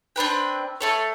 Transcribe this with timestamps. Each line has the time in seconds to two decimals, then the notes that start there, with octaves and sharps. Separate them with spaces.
0.16 C4 D4 B4 G5
0.81 A3 A4 C#5